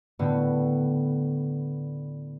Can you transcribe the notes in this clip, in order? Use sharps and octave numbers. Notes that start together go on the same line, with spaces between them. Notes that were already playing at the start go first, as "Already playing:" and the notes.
A2 D3 B3